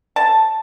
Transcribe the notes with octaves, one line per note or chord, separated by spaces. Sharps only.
A5